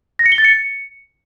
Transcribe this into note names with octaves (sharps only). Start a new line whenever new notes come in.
A#6
C#7
G7
A6
C#7